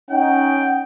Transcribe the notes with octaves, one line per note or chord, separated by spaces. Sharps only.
C#4 D#4 F#5 G5